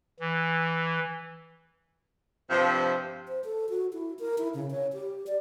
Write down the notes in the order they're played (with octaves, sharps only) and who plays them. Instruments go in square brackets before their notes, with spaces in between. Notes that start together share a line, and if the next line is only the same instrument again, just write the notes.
[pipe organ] E3
[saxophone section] G2 C3 F3
[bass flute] C5
A4
F#4
E4
A#4
E4
C#3
C#5
G4
D5